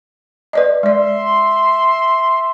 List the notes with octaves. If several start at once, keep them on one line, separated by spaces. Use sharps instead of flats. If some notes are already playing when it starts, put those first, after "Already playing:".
B4 D5 D#5
G#3 D5 E5 C6